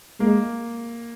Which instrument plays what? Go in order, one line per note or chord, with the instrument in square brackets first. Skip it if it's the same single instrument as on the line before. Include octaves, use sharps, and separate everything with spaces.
[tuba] G#3 [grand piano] A#3